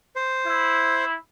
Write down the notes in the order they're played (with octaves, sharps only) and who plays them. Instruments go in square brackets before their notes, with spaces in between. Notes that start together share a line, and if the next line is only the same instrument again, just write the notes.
[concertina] C5
[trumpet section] E4